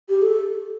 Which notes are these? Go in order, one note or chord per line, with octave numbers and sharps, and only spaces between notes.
G4
A4